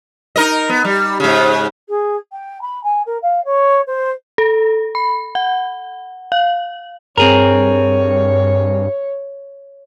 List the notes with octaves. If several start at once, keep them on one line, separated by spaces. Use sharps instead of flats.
D#4 A#4 D#5
B3
G3
G#2 C#3
G#4
G5
B5
G#5
A#4
F5
C#5
C5
A4
B5
F#5
F5
G2 C4 G#4 A#4 C#5